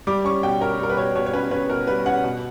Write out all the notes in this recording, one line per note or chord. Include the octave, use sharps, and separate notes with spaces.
G3 D6
C#4 C#6
B2 G5
C#4 A#4
G3 A#4
B4
B2 C#5
B2 C#5
C#5
C#4 B4
C#4 B4
B2 A#4
G3 B4
C#4 F#5
B2